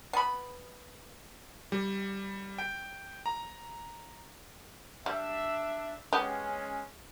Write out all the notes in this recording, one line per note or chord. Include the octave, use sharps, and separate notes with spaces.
B3 B5
G3
G5
A#5
G3 D4 E5
G#3 B3 C#4 G4